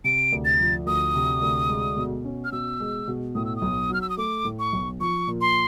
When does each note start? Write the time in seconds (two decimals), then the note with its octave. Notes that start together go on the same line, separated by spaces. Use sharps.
0.04 C3 D7
0.32 D2
0.45 A6
0.59 F3
0.86 D2 D#6
1.15 C3
1.41 D2
1.69 G#3
1.97 B2
2.24 C#4
2.44 F6
2.52 B2 E6
2.80 G#3
3.07 B2
3.35 A2 D#6
3.45 E6
3.56 D#6
3.62 B1
3.90 F#3 F6
4.01 E6
4.10 D#6
4.17 A3 D6
4.45 A2
4.59 C#6
4.73 B1
5.00 F3 C#6
5.27 A#2
5.41 C6